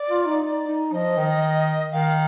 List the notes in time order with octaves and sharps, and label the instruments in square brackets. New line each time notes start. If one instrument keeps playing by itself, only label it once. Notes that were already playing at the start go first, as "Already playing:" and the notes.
Already playing: [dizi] D5
[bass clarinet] F4
D#4
D#4
D#4
[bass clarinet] F3 [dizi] D#5
[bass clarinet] D#3
[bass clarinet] D#3 [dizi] F5